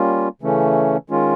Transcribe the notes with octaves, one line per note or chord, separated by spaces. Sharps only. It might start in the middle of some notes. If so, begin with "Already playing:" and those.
Already playing: G3 A#3 C#4 F4
C#3 E3 A3 C#4
D#3 G#3 C#4 F4